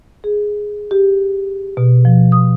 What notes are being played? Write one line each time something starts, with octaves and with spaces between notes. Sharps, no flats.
G#4
G4
B2
F3
D#6